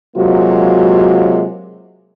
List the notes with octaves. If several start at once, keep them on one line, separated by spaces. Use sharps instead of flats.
C3 F#3 G#3 A#3 F4 F#4